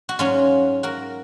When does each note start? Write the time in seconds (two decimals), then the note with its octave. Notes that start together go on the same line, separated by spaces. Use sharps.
0.09 F#4
0.19 G#2 F#3 C#4 F4
0.83 F#4 A#4